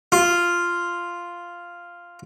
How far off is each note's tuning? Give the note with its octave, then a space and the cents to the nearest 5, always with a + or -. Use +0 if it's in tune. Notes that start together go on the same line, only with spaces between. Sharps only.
F4 -5